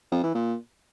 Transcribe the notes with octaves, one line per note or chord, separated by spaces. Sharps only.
F2
E3
A#2